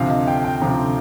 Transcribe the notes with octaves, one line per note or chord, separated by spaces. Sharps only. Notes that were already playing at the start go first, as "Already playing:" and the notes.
Already playing: D2 C3 F3 F5
D#5
G5
G5
D2 C3 F3 A#5